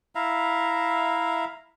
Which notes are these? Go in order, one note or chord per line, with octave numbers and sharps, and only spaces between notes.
E4 E5 F5 A#5